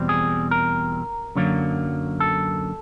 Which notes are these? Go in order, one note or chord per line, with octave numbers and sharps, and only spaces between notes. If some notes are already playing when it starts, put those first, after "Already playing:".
Already playing: E2 B2 G3 C4
G#4
A#4
F#2 D3 F#3 A#3
A4